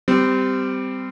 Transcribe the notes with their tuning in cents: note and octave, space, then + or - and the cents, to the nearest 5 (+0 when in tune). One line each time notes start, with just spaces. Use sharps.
G3 +0 C4 -25